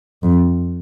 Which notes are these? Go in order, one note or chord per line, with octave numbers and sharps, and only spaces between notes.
F2